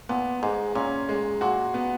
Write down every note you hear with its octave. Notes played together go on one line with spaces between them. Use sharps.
A#2 B3
G#2 G#3
A#2 C#4
G#3
A#2 F#4
B3